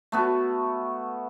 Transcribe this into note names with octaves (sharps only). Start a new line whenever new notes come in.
A3 B3 F#4